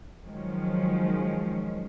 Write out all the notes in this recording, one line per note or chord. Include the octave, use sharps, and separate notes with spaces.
D#3 F3 F#3 G#3 C#4